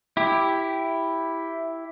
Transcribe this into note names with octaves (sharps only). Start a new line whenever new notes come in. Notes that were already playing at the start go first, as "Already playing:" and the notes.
E4 G4